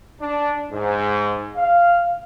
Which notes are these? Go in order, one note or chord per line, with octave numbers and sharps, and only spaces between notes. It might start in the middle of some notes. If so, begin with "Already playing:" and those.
D4
G#2
F5